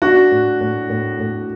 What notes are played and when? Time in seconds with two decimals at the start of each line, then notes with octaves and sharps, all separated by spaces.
0.02 D4 F#4
0.31 A2
0.61 A2
0.90 A2
1.19 A2